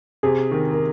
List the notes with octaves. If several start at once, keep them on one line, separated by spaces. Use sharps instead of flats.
C3 G#4
D#3 A#4
A#4